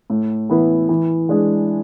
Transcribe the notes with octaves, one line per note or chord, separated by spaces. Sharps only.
A2
E3 B3 E4 B4
E3
G#3 D4 G#4